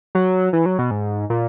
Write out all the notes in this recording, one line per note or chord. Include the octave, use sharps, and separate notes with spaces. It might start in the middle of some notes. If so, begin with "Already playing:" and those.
F#3
E3
F#3
B2
G#2
A#2